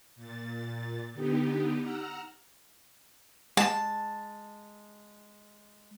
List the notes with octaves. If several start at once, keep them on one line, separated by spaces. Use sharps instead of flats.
A#2 A6
D3 B3 D#4 G4
F#5 A#5 E6 F6
G#3 A5